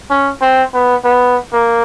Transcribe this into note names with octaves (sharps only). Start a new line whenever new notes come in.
C#4
C4
B3
B3
A#3